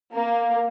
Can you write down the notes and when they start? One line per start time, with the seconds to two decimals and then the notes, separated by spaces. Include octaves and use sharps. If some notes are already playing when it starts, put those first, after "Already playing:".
0.13 A#3